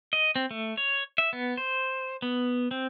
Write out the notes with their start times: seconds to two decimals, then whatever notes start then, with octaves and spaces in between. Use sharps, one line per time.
0.13 D#5
0.36 C4
0.51 A3
0.77 C#5
1.18 E5
1.33 B3
1.57 C5
2.22 B3
2.71 C4